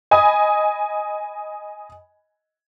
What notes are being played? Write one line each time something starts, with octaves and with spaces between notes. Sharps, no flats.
D#5 G#5 B5 D#6